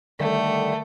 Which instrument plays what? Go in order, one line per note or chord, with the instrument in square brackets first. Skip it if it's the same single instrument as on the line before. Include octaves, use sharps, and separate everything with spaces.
[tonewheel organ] D3 D#3 G3 [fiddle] A3